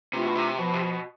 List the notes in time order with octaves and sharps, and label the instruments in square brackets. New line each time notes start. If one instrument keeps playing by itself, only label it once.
[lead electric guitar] C3 [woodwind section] E3 A3 D4 F4
[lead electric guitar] B2
C3
[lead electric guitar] B2 [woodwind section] F3
[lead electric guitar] C3
B2